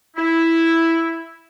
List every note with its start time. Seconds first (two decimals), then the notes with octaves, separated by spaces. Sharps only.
0.17 E4